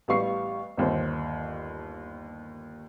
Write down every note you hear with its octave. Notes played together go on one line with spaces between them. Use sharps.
A1 G3 B3 F5 C#6 C7
G1 D#2 C5